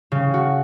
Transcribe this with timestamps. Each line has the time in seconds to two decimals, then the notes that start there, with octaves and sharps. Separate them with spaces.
0.12 C#3
0.34 F#4